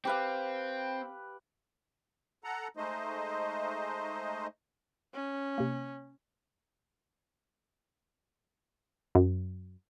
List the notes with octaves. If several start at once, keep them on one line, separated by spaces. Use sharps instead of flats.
C4 G4 B4 F5
A4 F#5 A#5
G#3 A3 D#4 C5 D#5
C#4
C3 A#3
F#2